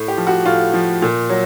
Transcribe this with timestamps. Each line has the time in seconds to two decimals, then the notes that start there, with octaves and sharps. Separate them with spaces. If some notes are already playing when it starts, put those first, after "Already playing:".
Already playing: A2
0.08 G4
0.17 F3
0.27 F#4
0.45 A2 F4
0.73 F3
1.02 A#2
1.30 F#3